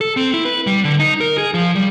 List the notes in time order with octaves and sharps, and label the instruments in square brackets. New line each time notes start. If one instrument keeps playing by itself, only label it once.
[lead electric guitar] A4
C4
E4
B4
G3
D3
D#4
A#4
G#4
F3
G3